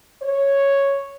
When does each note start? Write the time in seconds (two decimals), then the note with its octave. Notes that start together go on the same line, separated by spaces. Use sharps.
0.22 C#5